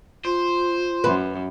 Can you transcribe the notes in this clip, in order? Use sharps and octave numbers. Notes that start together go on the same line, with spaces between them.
F4 C5
F#2 B4